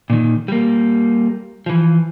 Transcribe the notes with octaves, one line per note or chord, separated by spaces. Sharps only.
A#2 D#3
G3 A#3
E3 F3